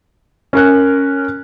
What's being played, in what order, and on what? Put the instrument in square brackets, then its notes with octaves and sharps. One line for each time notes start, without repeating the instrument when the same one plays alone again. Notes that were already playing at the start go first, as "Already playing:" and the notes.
[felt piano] C#4 A#4 F#6